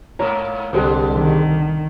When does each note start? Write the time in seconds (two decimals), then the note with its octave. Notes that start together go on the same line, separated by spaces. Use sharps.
0.19 G#2 A#3 E4 C#5 A#5
0.73 C2 B2 D3 G3 G#3 G4 A4 C5
1.16 D#3